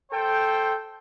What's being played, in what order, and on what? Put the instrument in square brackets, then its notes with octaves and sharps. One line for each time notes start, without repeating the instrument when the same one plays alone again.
[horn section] A4 C5 G5